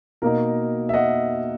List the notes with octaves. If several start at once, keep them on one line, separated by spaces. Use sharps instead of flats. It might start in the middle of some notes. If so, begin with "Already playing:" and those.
B2 A#3 D#4 A#4
E5
D#5 F#5